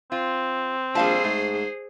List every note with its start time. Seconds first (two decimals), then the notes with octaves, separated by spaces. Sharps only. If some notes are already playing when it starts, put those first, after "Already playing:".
0.12 C4 F4
0.95 A#1 G3 G#4 C5 F5 A5
1.24 G#2 A3